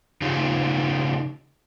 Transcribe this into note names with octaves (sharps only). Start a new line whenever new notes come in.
C#3 D#4 F4 G4